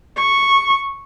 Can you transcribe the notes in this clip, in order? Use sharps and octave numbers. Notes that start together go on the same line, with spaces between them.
C#6